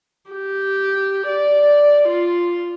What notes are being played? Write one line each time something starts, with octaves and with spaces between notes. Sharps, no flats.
G4
D5
F4